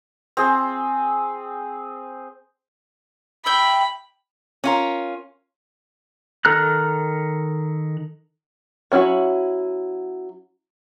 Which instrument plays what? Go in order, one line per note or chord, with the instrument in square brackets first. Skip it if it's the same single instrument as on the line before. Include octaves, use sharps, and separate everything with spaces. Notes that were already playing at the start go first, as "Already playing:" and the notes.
[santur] C4 G#4
[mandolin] E5 G5 [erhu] B5
[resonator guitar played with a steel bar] C#4 F4 A#4
[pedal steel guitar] D#3 A4 A#5 F6 F#6
[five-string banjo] F#3 C#4 E4 F#4